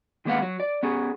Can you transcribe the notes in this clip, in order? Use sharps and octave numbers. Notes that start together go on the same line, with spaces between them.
D#3 G#3 A#3 B3 F5 F#5
F#3
D5
B3 C#4 G#4